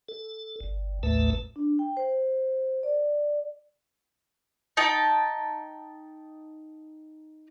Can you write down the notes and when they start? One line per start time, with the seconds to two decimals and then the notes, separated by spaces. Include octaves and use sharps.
0.09 A4
0.60 G1
1.03 A1 D#2 A2 A3 B4 A5
1.56 D4
1.79 G5
1.97 C5
2.83 D5
4.77 D#4 G5 A5